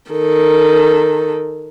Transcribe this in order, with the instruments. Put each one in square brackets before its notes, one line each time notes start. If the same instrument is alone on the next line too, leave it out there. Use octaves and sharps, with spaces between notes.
[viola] D#3 A4